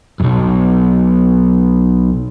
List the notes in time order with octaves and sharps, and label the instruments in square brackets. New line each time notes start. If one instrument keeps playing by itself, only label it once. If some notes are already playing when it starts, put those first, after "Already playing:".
[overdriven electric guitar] B1 F#2